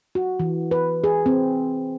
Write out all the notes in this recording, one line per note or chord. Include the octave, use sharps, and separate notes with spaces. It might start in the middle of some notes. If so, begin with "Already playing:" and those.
F#4
E3
B4
G#4
C4